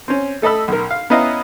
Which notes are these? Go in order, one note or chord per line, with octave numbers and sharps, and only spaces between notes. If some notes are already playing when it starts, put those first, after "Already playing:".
C4 C#4
A3 A4 D#5 B5 E6
B1 A#4
F5
B3 C#4 E4 D#5 F5 A#5